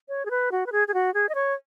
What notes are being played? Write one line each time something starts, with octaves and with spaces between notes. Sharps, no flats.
C#5
G#4
B4
F#4
B4
G#4
G#4
F#4
G#4
D#5
C#5